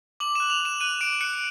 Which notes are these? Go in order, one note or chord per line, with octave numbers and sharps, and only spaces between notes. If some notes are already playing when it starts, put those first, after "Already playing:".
D6 F#7
E7
F#6
F7
D6 E7
F#6 D#7
D6 D7
F#6 C#7